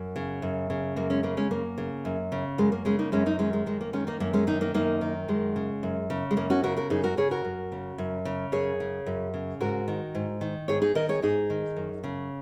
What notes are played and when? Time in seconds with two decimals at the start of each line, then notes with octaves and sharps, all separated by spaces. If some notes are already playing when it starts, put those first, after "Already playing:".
Already playing: F#2
0.16 C#3
0.42 F#2
0.70 C#3
0.96 F#2 A#3
1.10 G#3 C#4
1.23 C#3 A#3
1.37 G#3 C#4
1.51 F#2 A#3
1.78 C#3
2.05 F#2
2.32 C#3
2.58 F#2 G#3
2.72 A#3
2.85 C#3 G#3 C#4
2.99 A#3 D#4
3.12 F#2 G#3 C#4
3.26 A#3 D#4
3.39 D#3 G#3 C#4
3.53 G#3
3.66 F#2 G#3
3.81 A#3
3.93 D#3 G#3 C#4
4.07 A#3 D#4
4.20 F#2 A#3
4.33 G#3 C#4
4.47 D#3 A#3 D#4
4.61 A#3 D#4
4.74 F#2 A#3 D#4
5.01 D#3
5.28 F#2 G#3
5.56 C#3
5.83 F#2
6.10 C#3
6.31 G#3
6.37 F#2 A#3
6.50 C#4 F#4
6.63 C#3 F#4 A#4
6.77 F#4 A#4
6.90 F#2 D#4 G#4
7.04 F#4 A#4
7.17 C#3 G#4 C#5
7.31 F#4 A#4
7.45 F#2
7.72 C#3
7.98 F#2
8.25 C#3
8.52 F#2 G#4 C#5
8.80 C#3
9.06 F#2
9.34 C#3
9.61 G#2 F#4 A#4
9.88 D#3
10.15 G#2
10.41 D#3
10.68 G#2 G#4 C#5
10.82 D#4 G#4
10.95 D#3 A#4 D#5
11.09 G#4 C#5
11.22 G#2 D#4 G#4
11.50 D#3
11.77 F#2
12.04 C#3